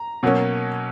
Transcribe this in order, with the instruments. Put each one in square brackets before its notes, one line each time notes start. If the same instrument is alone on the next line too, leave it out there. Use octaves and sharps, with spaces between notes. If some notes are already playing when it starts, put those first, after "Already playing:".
Already playing: [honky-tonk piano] A#5
B2 F#3 A#3 C#4